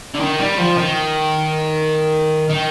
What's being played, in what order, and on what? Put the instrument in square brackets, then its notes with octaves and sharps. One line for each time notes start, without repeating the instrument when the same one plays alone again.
[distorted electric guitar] D3
D#3
G3
F3
D#3
D#3